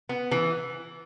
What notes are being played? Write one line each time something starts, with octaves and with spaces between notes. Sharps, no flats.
B3
E3